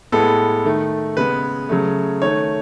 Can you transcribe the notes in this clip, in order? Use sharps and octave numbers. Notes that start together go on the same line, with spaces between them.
A2 G#3 B3 A4
D#3 A3
C#3 G#3 B3 B4
C#3 F#3 A3
D#3 A3 C#5